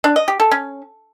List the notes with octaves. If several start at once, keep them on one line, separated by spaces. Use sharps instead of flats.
D4
D#5
G4
A4
C#4